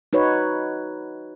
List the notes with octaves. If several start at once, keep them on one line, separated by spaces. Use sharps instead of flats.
D#4 F#4 B4 C#5